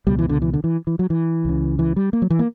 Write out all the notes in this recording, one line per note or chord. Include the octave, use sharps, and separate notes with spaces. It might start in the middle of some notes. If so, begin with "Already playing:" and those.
C#2 B2 G3
E3
D3
E3
D3
E3
E3
F#3
E3
C#2 C#3
E3
G3
A#3
F#3
E3
A#3